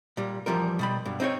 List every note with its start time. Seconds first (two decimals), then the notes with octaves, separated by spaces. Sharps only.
0.17 A#2 G3
0.46 E2 F3 G3 A#4
0.79 B2 G3 B5
1.05 G2 B2
1.20 C4 D#4 F4 C#5